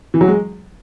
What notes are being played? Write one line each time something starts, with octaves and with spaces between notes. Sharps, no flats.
E3
F#3
G#3